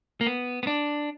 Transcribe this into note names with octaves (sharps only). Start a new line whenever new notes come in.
A#3
B3
B3
D4